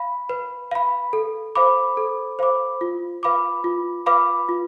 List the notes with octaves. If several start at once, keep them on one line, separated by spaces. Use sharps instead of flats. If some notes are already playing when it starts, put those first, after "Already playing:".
Already playing: F5 B5
B4
F5 B5
A4
C5 F5 B5 D6
A4
C5 F5 B5 D6
F4
B4 F5 B5 D6
F4
B4 F5 B5 D6
F4